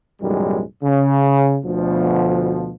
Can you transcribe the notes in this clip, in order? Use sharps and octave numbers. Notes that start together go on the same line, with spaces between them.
B1 F#2 A2 D#3 G3 G#3
C#3
D2 B2 F3